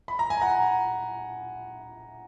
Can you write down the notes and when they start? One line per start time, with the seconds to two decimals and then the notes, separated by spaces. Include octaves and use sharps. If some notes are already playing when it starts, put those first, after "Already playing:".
0.08 B5
0.19 A#5
0.30 G#5
0.41 F#5 A#5